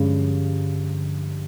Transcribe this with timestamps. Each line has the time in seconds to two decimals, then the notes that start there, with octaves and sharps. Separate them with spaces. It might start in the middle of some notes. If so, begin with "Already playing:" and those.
Already playing: G2 D3 F3 G#3 C#4